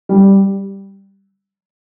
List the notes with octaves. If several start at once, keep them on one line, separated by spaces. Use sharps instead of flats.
G3